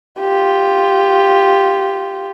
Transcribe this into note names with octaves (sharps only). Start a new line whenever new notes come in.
F4 G4